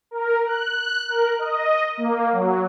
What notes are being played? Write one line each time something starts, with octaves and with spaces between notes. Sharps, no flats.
A#4
F#6
F#6
A#4
D#5
A#3
F#3